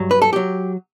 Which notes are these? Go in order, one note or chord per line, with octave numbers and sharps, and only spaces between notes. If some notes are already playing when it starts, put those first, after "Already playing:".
Already playing: G2 F#3
B4
A4
F#3 G4